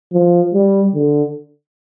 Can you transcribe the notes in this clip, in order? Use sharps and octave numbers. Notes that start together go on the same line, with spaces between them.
F3
G3
D3